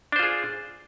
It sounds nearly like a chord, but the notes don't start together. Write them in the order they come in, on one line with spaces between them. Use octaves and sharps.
D4 C5 F4 G#4